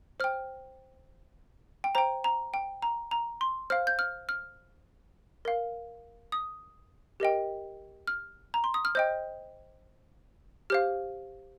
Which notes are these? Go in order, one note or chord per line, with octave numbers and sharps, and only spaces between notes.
C5 G5 F6
G5
C5 G5 A#5
A#5
G5
A#5
A#5
C6
C5 F5 F6
G6
F6
F6
A#4 F5
D#6
G4 A#4 D#5 G5
F6
A#5
C6
D#6
F6
C5 D#5 G5 G6
G4 C5 F5 F6